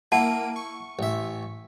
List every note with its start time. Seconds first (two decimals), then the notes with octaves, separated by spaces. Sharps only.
0.12 A#3 E4 F#5 A5 D7 D#7
0.56 C#6
0.99 A1 E5